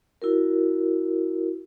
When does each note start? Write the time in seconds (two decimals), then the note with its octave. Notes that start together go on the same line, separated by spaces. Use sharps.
0.22 E4 F#4 A#4